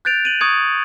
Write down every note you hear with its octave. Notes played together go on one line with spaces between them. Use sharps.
F#6 G6 A6 D7 F7
D#7 F#7
C#6 D#6 G#6 C#7